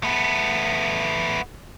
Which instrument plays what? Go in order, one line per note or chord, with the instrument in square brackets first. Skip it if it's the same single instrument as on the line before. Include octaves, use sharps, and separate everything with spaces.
[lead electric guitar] A3 B3